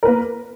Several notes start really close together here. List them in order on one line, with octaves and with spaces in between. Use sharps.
A#4 B4 A#3